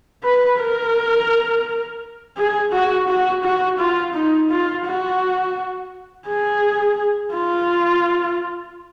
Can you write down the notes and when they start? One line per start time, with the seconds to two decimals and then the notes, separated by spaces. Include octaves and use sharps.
0.24 B4
0.59 A#4
2.37 G#4
2.72 F#4
3.08 F#4
3.43 F#4
3.79 F4
4.14 D#4
4.50 F4
4.86 F#4
6.28 G#4
7.35 F4